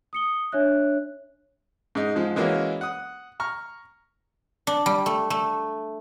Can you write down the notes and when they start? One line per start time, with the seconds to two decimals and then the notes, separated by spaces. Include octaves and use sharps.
0.13 D#6 C#7 G7
0.52 D4 C#5 E5 F#6
1.95 G#2 D#4
2.15 G#2 F3 G#3
2.36 E3 G#3 A#3 C#4 F#4 A#4
2.81 F#5 D#6
3.40 A#5 C#6 F6
4.67 D4
4.86 G3
5.06 A3
5.30 A3